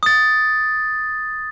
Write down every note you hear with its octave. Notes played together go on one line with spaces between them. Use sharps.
D#6 A6